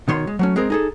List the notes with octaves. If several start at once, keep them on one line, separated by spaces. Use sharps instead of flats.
B2 D#3 C#5 C6
G#3
F#3 A3 C#4
G#3 C4 G#4 A#4
D#4 G#4 A4